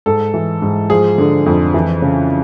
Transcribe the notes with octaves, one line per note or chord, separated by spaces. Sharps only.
G#2 A4
E3
G#2
F3 G#4
D3
F2
E3
C#3